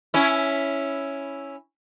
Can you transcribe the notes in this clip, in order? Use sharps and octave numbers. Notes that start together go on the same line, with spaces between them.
C#4 E4